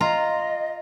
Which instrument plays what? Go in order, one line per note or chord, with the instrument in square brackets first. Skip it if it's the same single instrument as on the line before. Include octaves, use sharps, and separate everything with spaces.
[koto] F4 A#5 [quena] D#5